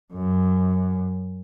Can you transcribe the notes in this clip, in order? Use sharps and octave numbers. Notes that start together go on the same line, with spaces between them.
F#2